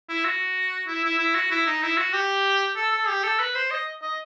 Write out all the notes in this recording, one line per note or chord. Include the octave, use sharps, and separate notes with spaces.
E4
F#4
E4
E4
E4
F#4
E4
D#4
E4
F#4
G4
A4
A4
G4
A4
B4
C5
D#5
D#5